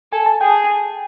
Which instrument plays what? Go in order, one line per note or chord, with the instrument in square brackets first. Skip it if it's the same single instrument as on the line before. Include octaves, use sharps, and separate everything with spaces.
[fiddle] A4 [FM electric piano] G#5
[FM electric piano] A5
[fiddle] G#4 [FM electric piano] G5